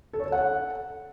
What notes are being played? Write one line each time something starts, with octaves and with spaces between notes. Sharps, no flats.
A4
C#5
A4
F#5